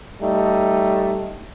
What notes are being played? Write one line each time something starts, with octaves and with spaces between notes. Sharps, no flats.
G3 A3 D#4